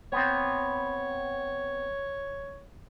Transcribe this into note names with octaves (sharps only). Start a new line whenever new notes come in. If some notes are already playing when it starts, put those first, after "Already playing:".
B3 C4 C#5